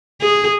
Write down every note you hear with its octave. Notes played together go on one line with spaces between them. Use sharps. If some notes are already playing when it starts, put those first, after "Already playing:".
G#4